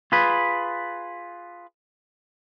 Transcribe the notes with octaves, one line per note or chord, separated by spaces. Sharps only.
F4 G#4 B4